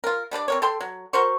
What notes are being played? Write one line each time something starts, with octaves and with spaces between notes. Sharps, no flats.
F4 A#4
G3 D4 B4 D5
C4 A#4 C#5
A4 G5 C6
F#3
F#4 A#4 C5 C#6